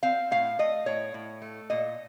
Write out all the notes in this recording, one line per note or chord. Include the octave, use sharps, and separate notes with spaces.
C4 F5
A2 F5
A3 D#5
A2 C#5
A2
A3
A#2 D#5